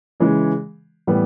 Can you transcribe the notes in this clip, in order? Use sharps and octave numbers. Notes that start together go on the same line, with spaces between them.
C#3 E3 G#3
A2 E3 G3 B3